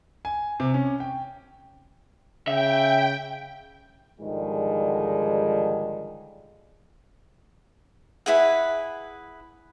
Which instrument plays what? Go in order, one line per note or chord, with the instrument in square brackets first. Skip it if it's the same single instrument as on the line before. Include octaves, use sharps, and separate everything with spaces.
[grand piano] G#5
C3
C#4
G5
[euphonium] C#3 [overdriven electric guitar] E5 [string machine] G5
[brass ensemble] G#2 D3 D#3 F3 G3 G#3
[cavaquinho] E4 G#4 B4 F#5